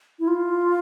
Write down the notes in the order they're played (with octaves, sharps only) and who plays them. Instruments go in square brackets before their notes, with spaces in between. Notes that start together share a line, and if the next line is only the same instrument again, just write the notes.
[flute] E4
F4